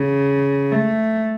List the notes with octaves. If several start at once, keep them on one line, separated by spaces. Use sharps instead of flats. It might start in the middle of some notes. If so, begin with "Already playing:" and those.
Already playing: C#3
A3